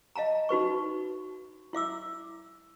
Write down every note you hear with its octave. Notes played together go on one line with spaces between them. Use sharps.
D#5 F5 A5 A#5
D#4 F#4 B4 C#6
E4 E5 D6 E6